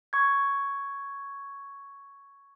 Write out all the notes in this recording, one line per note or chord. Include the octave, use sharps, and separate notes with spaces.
C#6 G#6